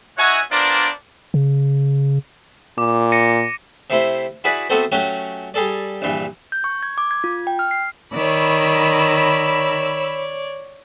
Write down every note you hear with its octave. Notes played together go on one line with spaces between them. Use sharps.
D#4 F#4 C#5 E5 F#5 G#5
B3 D4 F4 A#4 C5 D5
C#3
A#2 D6
A#6 C#7 D#7
C3 A3 E4 C5
E4 F#4 G#4 B4 D5 E5
A3 B3 C4 F#4 A4 C5
F#3 A3 C#4 F#4 G4 F#5
G3 G#4 A4 D5
A#1 G2 E3
G6
C#6
G#6
D6
G#6
F4
G5
F6
C7
D#3 C#5 D5 B5 E6